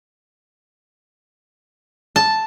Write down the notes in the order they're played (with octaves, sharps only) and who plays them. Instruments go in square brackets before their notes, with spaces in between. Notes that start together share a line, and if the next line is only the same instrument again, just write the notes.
[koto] A5